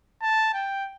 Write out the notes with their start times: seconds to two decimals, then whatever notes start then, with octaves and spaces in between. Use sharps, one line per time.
0.22 A5
0.54 G5